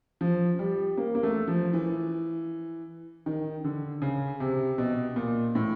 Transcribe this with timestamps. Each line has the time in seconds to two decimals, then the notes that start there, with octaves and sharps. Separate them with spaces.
0.21 F3
0.59 G3
0.97 A#3
1.15 A#3
1.23 A3
1.48 F3
1.73 E3
3.26 D#3
3.64 D3
4.02 C#3
4.40 C3
4.78 B2
5.16 A#2
5.55 A2